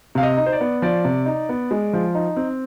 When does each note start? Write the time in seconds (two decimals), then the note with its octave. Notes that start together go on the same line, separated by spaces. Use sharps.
0.15 C3 F5
0.23 D#5
0.37 D#4
0.46 C5
0.52 D5
0.61 B3
0.82 F3 D5
1.05 C3
1.26 D#4
1.49 B3
1.71 G#3
1.93 F3
2.14 D#4
2.37 C4